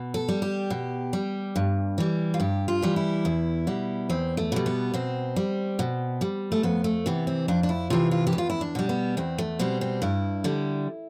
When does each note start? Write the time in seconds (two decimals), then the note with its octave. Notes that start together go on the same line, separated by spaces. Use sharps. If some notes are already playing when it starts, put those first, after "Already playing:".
Already playing: B2
0.14 A4
0.28 G3
0.42 G4
0.70 B2
1.13 G3
1.56 G2
1.98 E3 G3
2.34 F4
2.40 G2 G4
2.68 F4
2.82 E3 G3
2.96 E4
3.25 E2
3.67 B2 G3
4.09 E2 C4
4.37 A3
4.52 B2 G3
4.66 B3
4.94 B2 C4
5.36 G3
5.79 B2
6.21 G3
6.52 A3
6.63 F2 B3
6.84 A3
7.06 C3 E3 B3
7.27 C4
7.48 F2 D4
7.63 D4
7.69 E4
7.90 C3 E3 F4
8.11 F4
8.27 G4
8.33 E2
8.38 F4
8.50 E4
8.61 D4
8.75 B2 G3
8.89 B3
9.17 E2 C4
9.38 A3
9.59 B2 G3 C4
9.81 C4
10.02 G2 E4
10.44 D3 G3